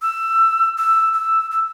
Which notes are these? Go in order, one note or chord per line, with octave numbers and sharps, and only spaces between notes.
E6
E6
E6
E6